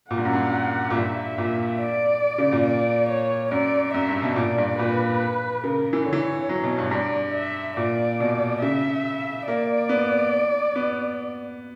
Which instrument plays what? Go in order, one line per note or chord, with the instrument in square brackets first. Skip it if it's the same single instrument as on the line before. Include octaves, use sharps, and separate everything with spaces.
[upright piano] A#2 [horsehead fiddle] F#5
[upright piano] G2
F#2
G2
A#2
[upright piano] G2 [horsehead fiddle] E5
[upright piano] A#2
[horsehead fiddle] D5
[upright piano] C#3
A#2
[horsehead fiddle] D5
C#5
[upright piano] F#2 [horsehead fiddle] D5
[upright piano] F#2 [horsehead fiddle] E5
[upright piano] G2
B2
[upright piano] A#2 [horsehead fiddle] D5
[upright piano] G2
[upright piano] A#2 [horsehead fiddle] B4
[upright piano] C#3 [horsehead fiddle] A#4
[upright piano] E3
[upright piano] D3 [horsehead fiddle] C#5
[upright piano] E3
F#3
B2
G2
[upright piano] G2 [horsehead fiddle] D5
[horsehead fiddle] E5
[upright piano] A#2 [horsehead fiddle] D5
[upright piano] B2
[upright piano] C#3 [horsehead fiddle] E5
[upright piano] A#3 [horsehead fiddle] D5
[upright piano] B3
B3